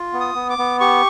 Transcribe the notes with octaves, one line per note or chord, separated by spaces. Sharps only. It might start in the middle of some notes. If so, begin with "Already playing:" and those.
Already playing: F4
B3
D#6
B3
D6
B3
G4 C#6